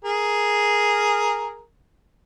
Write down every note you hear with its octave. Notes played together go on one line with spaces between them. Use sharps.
G#4 A#4